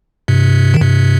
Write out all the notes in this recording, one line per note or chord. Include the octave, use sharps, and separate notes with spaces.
G2 C3
D#3
G2 C3